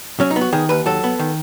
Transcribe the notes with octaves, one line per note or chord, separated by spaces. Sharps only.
F#3 C#4
D#4
B3
F#4
D#3 G#4
D#2 B4
F#3 A4
B3
D#3